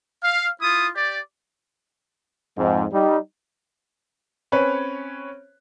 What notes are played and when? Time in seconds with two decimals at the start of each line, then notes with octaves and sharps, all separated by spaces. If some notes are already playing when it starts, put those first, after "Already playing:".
0.23 F5
0.61 E4 F4 D#6
0.95 G4 D5
2.57 F2 G#2
2.92 G3 D#4
4.52 C4 C#4 B4 C#5